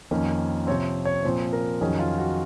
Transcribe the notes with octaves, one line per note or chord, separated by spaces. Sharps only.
F2 D#3 A#3 C#4
C3 F3 C4 C#5
C#5
A#2 F3 C4 C5
A#4
F2 D#3 F#3 C#4 G#4
F4
F#4